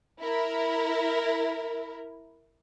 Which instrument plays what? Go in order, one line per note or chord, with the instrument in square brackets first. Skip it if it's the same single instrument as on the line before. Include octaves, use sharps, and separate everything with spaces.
[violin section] E4 A#4